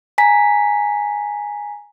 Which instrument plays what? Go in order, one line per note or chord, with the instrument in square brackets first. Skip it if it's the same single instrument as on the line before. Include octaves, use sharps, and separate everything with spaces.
[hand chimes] G#5 A#5 B6